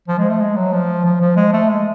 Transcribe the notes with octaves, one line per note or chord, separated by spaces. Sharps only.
F3
G#3
A3
G#3
F#3
F3
F3
F3
G#3
A3
G#3